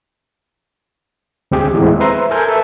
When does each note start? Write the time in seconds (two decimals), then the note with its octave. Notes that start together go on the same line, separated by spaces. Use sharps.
1.51 D2 C4 G4 G#4
1.74 D#2 A2 E3 G#3 B3 C4
2.00 B4 C5 E5 A#5 C6
2.31 A4 A#4 G#5 G6
2.48 A4 B4 E5